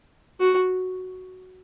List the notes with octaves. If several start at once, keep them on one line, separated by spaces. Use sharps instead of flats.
F#4